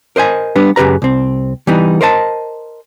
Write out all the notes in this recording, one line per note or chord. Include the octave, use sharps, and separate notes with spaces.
A#4 C5 D#5 G#5
G3 B3 D4 B4
F#2 C#3 G4 B4 A#5
C2 C4
E3 G3 B3 D#4
A#4 C5 D#5 A5